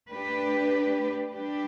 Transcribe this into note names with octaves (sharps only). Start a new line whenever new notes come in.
A3 D4 G4 B4
G3 D4 G4 B4